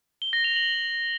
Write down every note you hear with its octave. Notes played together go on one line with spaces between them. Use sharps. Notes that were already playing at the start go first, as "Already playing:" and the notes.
G7
A#6
F7
F#7